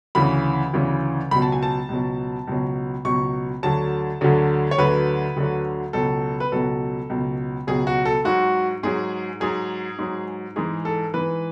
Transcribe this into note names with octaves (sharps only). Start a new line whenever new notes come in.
D2 C#3 E3 B5
D2 C#3 E3
C#2 B2 F#3 B5
A5
G#5
A5
C#2 B2 F#3
C#2 B2 F#3
C#2 B2 F#3 C#6
D2 D3 F#3 A5
D2 D3 F#3
C#5
D2 D3 F#3 B4
D2 D3 F#3
C#2 B2 F#3 A4
B4
C#2 B2 F#3 A4
C#2 B2 F#3
C#2 B2 F#3 G#4
F#4
A4
G#2 F#3 F#4
G#2 F#3 G#4
G#2 F#3 G#4
G#2 F#3
G#2 E3 G#4
A4
G#2 E3 B4